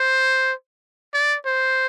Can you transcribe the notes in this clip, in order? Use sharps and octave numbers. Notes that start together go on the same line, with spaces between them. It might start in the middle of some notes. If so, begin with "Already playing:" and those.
Already playing: C5
D5
C5